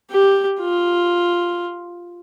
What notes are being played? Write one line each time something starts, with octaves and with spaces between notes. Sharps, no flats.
G4
F4